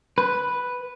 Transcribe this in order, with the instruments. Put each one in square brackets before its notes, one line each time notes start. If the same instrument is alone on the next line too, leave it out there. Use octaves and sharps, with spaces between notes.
[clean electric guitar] B4